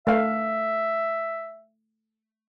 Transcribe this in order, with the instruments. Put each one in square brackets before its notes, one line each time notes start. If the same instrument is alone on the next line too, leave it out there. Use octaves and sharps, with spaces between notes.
[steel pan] A3 F5 [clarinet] E5